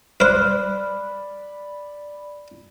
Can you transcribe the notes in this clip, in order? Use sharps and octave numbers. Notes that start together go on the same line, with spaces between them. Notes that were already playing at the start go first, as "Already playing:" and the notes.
B4 C5 D5 B5 F6 F#6